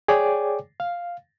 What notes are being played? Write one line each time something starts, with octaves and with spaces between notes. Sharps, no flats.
G#4 C#5 D5 G5 G#5 D6
F5